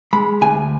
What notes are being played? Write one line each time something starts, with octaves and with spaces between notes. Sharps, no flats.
G#3 B5
D2 G#5